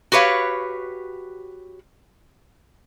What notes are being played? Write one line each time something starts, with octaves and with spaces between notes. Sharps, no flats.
F#4 G4 B4 C#5 F5